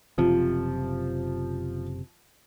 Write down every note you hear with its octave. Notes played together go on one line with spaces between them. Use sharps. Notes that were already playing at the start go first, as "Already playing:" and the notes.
F#1 C3 F3